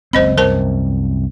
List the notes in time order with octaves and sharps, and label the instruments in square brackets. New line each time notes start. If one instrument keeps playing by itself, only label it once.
[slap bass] F#1 C#2 C4 [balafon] C5 D#5 B5
[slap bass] C2 F#2 [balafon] A#4 C5 A5